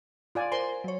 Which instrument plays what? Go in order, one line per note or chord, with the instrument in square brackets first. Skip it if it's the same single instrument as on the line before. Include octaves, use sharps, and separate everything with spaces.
[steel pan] F4 D5 G#5
[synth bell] A#4 C5 G#5 [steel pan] C6
[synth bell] F#3 C#5